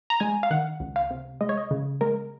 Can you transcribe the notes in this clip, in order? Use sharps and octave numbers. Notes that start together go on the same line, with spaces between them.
A#5
G#3 G#5
F5
D#3 F#5
C#2
F5
C3
G#3 D#5
C#5
D#5
C#3
G#3 A#4